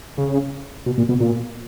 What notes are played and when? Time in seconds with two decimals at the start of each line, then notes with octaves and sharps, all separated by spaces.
0.17 C#3
0.86 B2
0.98 A#2
1.09 B2
1.20 A#2